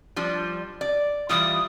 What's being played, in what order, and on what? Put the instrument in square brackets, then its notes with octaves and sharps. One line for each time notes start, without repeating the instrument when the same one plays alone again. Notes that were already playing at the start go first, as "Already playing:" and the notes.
[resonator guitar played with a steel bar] F3 G3 D4
D5
[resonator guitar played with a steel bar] E3 G3 F4 [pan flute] D#6